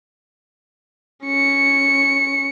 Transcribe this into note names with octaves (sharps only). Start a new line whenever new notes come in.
C#4 C#7